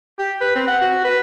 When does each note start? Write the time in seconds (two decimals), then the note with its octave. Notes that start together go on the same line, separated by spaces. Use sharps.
0.19 G4
0.41 B4
0.55 C4
0.68 F#5
0.81 F#4
1.05 B4